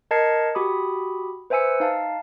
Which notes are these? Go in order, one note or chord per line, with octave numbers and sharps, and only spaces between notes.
A#4 D#5 A5 G#6 C7 C#7
F#4 G4 B5 D#6
B4 C5 E5 G#5 E6 C#7
D#4 F5 A5